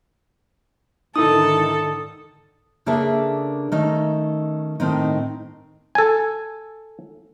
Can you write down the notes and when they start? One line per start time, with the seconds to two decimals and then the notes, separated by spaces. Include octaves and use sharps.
1.16 G#2 D3 D#3 D#4 E4 A4 D#6
2.86 C#3 A#3 D4 G#4 A4 E5
3.72 D#3 A3 C#4 D#4
4.80 A2 D#3 C4 D#4
5.95 A4 G#5